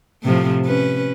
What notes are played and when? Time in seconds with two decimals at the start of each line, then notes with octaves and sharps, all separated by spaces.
0.23 A2 C3 F3
0.65 C#4 B4